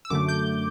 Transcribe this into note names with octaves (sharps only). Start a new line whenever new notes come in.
E6
F#2 D3 A3 D6
G6